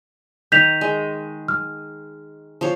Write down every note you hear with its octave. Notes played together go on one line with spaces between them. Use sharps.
D#3 G6 B6 F7
G#3
F6
F3 C5 C#5